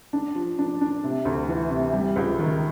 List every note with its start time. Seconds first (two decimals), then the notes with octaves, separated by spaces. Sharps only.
0.13 D4
0.35 F3
0.59 D4
0.81 D4
1.04 C3
1.25 D2
1.49 E3
1.71 C3
1.94 G3
2.16 C#2
2.39 D#3